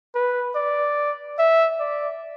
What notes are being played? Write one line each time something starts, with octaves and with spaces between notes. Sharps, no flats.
B4
D5
E5
D5